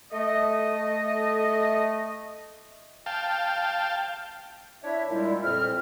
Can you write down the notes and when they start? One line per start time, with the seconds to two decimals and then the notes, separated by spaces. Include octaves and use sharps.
0.11 A3 D#5
3.06 F5 G5 A5
4.83 D4 E4 C#5 E5
5.09 A#2 G3 G#3 E4
5.43 F2 A#2 C4 F6